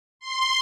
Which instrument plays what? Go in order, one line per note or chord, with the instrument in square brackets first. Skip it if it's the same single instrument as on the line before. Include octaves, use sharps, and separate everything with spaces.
[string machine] C6